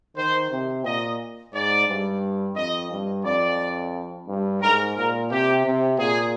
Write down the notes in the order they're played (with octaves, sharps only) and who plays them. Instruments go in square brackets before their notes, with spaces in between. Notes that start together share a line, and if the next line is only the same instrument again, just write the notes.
[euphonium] D#3 [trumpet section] C5
[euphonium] C3
[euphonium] A#2 [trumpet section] D#5
[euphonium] G#2 [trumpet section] D5
[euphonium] G2
[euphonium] F2 [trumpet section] D#5
[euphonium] G2
[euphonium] F2 [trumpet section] D5
[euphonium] G2
[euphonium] G#2 [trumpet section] A#4
[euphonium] A#2 [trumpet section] A#4
[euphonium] C3 [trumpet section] G4
[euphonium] C3
[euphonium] A#2 [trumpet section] G#4